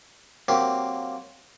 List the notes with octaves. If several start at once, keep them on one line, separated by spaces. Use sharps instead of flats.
F#3 A#3 C4 G4